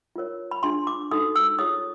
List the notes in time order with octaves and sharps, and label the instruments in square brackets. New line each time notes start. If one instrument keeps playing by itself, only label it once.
[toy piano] F4 A#4 C#5
B5
D4 F4 G#4 C6
D6
D#4 F#4 A4 D#6
E6
F4 G#4 C#5 D#6